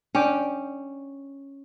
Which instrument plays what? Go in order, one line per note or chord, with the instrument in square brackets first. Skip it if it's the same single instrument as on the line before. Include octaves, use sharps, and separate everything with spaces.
[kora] C#4 [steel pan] D4 G5 D6